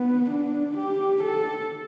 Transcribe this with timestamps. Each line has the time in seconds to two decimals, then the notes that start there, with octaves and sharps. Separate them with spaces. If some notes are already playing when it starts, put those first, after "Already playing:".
Already playing: B3
0.30 D4
0.77 G4
1.23 A4